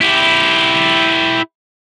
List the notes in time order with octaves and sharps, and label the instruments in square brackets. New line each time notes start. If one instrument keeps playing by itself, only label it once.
[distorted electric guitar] E4 G4